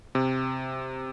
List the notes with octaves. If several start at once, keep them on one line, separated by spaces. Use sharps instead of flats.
C3